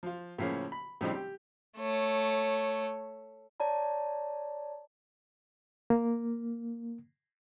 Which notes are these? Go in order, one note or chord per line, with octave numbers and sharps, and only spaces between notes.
F3 F4
A2 C#3 F3 A#3 C#4
B5
A2 C#3 F3 G3 C4 D#4
G4
A3 C#5
C#5 D5 A5 A#5
A#3